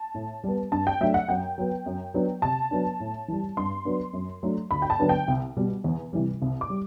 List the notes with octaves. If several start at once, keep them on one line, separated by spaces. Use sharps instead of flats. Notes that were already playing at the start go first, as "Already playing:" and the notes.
Already playing: A5
A2
G3 B3
G2 A5
G5
F#3 A3 D4 E5
F#5
F#2 G5
F#3 B3
F#2
F#3 B3 D4
C3 A5
F#3 B3 D4
A2
E3 G3
G2 C6
F#3 B3 D4
F#2
F#3 A3 D4
D2 B5
G5
A5
D3 F#3 B3 D4
G5
C2
B2 G3
E2
C3 E3 G3
C2
D6
G3